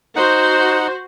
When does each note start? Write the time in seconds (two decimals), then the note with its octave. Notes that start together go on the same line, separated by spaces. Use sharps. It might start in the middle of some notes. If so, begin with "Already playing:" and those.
0.16 D#4 F#4 C5 F#5